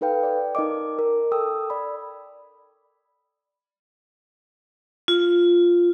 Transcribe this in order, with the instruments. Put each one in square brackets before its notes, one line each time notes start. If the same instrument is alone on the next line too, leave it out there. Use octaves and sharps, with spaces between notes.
[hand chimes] D#4 A4 B4 F5 G5
D5 G5
D#4 A#4 D#5 D6
A#4
A4 G5 D#6 E6
D5 B5
[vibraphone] F4